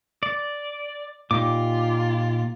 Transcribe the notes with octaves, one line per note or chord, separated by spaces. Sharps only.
D5
A#2 D#4 F4 G4 D6